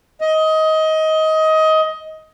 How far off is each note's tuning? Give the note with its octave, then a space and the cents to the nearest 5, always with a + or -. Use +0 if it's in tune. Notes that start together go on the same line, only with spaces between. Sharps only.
D#5 +20